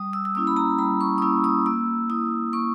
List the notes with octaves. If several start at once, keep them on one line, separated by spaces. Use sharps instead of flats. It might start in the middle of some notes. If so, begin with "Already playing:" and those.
Already playing: G3 D#6
E6
E6
A#3 C#4 E4 D#6
B5
A#5
G3 B5
C#6
D#6
A#3 C#4 E4 E6
D#6
A#3 E6
E4 D#6
A#3 C#6